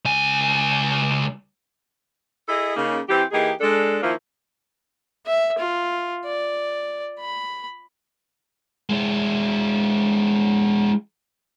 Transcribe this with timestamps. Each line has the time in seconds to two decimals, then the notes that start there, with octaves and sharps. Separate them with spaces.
0.05 C#2 G#5
2.47 E4 G#4 A4 D#5
2.75 C#3 A#3 D#4
3.09 E3 C4 G4
3.31 E3 A#3 D#4 G4 G#4
3.60 G#3 D4 A4
4.02 D#3 F3 A#3 E4 F4 C5
5.26 E5
5.59 F4
6.25 D5
7.19 B5
8.90 G#3 E4